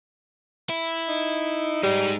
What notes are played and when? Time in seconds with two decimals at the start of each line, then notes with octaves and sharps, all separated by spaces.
0.69 E4
1.08 D#4
1.83 G3 G#3 D#4